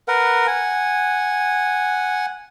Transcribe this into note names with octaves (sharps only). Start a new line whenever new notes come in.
A#4 B4 F#5
F#5 G#5